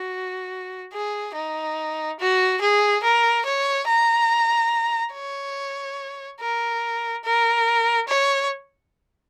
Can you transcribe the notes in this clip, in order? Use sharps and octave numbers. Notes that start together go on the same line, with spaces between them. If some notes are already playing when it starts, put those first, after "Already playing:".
Already playing: F#4
G#4
D#4
F#4
G#4
A#4
C#5
A#5
C#5
A#4
A#4
C#5